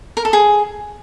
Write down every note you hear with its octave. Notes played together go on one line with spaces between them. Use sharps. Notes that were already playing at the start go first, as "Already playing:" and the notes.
A#4
A4
G#4